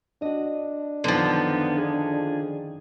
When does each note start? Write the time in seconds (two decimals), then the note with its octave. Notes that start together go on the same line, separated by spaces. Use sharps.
0.22 D4 F#4 D#5
1.04 F#2 D3 D#3 F3 B3
1.78 G#4